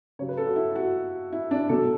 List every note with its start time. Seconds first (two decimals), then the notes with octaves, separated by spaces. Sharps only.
0.19 C#3 F#3 C#5
0.29 B4
0.37 A4
0.47 F#4
0.56 E4
0.76 F#4
1.32 E4
1.51 D4
1.69 B2 F#3 A4